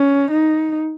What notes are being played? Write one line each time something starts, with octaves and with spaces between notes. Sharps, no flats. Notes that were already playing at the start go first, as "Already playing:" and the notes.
Already playing: C#4
D#4